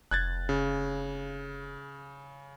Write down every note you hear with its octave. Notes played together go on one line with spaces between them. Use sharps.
F1 F#6 G#6 A6
C#3